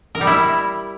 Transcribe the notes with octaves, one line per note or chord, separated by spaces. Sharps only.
A#4
G3
E4